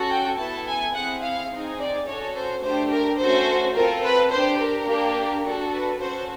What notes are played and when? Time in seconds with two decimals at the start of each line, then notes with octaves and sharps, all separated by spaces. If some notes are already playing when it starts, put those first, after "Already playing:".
Already playing: C#4 F#4 A4
0.09 G5
0.38 B3 E4 A4 A5
0.66 G#5
0.94 C4 E4 G#4 F#5
1.22 F5
1.50 C4 D#4 G#4
1.78 D5
2.07 C#4 F#4 A4 C#5
2.35 C5
2.62 A3 D4 G4 C5
2.90 A#4
3.19 A3 C#4 F#4 A4 C5
3.75 C4 F4 A4 A#4
4.03 B4
4.31 D4 G4 C5
4.59 A#4
4.87 A#3 D4 G4
5.44 D4 F#4 A4
5.73 B4
6.00 C#4 F#4 A4 C5